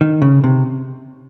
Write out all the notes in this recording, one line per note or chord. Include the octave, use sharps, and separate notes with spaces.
D#3
C#3
C3